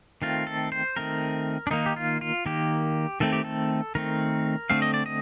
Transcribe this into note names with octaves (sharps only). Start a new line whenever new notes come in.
D#3 A3 C4 F4
A4
C5
D#3 A3 C4 A#4
D4
D#3 A#3 D#4
G4
F4
F4
D#3 A#3 G4
D#3 A3 C4 A4
G4
A4
D#3 A3 C4 A#4
D3 A3 C4 F5
D#5
D5
D#5